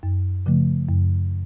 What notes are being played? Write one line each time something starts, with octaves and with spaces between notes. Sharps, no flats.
F#2
C#3 F3 A3
F#2